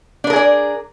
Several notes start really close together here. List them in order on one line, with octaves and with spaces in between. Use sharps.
D4 B4 A#4 G#4 D5